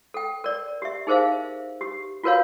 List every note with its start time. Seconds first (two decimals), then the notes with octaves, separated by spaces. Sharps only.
0.14 A4 G5
0.44 A#4 D5
0.82 G4 E5
1.07 D#4 G#4 A#4 C5 E5 F5
1.81 G4
2.23 F4 F#4 A#4 B4 C#5 F5